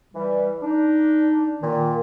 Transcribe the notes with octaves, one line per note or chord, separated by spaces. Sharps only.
E3 G3
D4 D#4
A#2 D#3